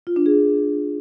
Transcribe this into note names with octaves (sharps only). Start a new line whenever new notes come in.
F4
D4
G#4